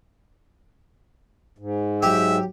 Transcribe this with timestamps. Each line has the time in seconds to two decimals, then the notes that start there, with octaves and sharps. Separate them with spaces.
1.58 G#2
2.03 F#3 G4 E5